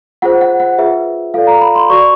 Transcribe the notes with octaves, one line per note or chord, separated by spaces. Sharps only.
F4 G#4 C5 F#5
F#5
F#5
F4 G#4 B4 E5
F4 A4 D5 F5
A#5
B5
C6
F#4 B4 D5 C#6